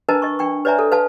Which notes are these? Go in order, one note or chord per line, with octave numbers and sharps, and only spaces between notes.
D4 A#4 B4 D#5 A5 A#5
D#5 C#6
D4 G5 C#6
B4 C#5 D5 E5 G#5 A#5
A4
B4 F5 A5